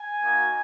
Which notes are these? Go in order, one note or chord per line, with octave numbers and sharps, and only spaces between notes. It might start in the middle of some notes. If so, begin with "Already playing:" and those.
Already playing: G#5
A#3 D#4 F#4